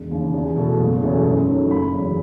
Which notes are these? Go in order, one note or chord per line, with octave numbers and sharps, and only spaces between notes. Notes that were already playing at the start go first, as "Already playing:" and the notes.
Already playing: E1
D#2 C#3
E2
B2 A3
F#1
E2 B2 A3 C#4
F#2
D#3 F#3 A3
F#1 B5
E2 C#3 F#3